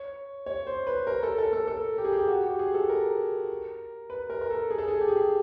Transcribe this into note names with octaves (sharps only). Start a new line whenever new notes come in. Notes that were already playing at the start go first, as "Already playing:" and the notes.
Already playing: C#5
C#5
C5
B4
A#4
A4
A4
A4
A4
G4
G#4
G4
F#4
G4
G#4
A4
A#4
B4
A#4
A#4
A4
G#4
A4
G#4
G4
G#4
G4